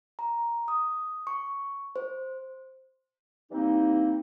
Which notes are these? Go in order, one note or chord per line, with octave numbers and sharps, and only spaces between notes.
A#5
D#6
C#6
C5
E3 G3 A#3 C4 D#4